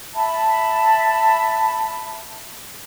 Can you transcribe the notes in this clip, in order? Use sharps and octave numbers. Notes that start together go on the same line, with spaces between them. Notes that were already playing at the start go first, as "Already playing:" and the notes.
E5 A5 B5